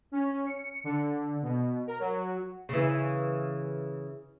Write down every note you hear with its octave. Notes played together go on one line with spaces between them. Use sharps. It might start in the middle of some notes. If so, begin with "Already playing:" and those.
C#4
C#7
D3
B2
A#4
F#3
C#3 E3